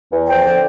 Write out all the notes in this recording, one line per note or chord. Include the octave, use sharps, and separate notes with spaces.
E2
F3 G5
D3